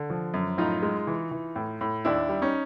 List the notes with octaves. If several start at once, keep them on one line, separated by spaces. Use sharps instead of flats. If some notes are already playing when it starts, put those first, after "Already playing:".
Already playing: D3
F3
F#2
A2 D#4 F4
G#3
E3
E3
A2
A2
D#2 D4 E4
G3
C#4 D#4